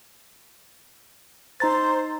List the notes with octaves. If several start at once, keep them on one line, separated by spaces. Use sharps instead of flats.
D#4 C5 A#5 A6